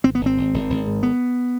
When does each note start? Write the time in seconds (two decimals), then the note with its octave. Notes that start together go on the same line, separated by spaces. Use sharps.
0.04 G#1 C4
0.15 B3
0.21 G#1 C4
0.37 G#1
0.54 G#1
0.70 G#1
0.87 G#2
1.03 B3